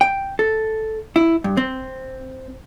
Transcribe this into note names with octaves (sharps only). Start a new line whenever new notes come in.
G5
A4
E4
G2
C4